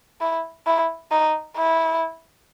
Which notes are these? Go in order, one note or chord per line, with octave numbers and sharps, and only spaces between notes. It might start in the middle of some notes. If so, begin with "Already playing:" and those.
E4
E4
D#4
E4